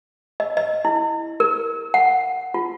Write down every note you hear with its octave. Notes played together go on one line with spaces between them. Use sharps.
D#5
D#5
E4
A#4
F#5
F4